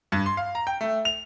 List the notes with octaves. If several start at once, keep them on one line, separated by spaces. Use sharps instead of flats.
G2
C6
F5
A#5
G5
A3
F7